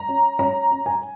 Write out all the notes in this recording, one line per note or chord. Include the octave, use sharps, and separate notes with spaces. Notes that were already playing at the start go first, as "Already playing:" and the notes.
Already playing: A#5
C#4
C#4 A#5
C#4
G#5